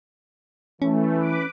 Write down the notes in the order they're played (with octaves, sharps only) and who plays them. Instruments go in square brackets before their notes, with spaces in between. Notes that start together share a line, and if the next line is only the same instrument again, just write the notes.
[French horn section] E3 [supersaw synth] A3 [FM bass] C#4
[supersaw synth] B4 D6